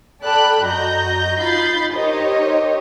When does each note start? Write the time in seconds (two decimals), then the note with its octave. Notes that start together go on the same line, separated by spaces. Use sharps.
0.23 A4 D5 G5 A5 B5 F#6
0.63 F#2 F#4 D#5 A#5 G6 A#6
1.39 D#4 F4 B5 G6 A6 C7
1.93 D#4 G4 A#4 C5 C#5 D#5